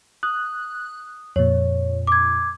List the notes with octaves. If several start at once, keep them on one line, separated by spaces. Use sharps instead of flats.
D#6 F#6
F2 A#2 C#5
D6 G#6